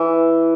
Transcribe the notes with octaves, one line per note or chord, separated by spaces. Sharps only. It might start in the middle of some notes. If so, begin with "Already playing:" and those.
Already playing: E3